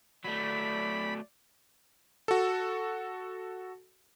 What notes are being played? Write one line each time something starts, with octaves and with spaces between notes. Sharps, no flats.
F#3 A3 D5 B5
F#4 A4